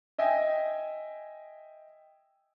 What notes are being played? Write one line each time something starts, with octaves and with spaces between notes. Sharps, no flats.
D#5 E5 G5 G#5